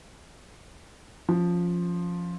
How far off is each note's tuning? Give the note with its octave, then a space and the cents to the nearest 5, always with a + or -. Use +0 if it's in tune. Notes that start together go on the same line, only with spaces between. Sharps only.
F3 +5 C#4 +0